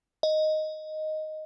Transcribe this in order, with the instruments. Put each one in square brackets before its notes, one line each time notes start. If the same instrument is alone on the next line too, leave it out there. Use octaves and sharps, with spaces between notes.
[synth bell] D#5